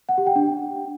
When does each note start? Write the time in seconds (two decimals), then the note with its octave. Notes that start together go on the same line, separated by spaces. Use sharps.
0.09 F#5
0.18 G4
0.27 G5
0.36 D4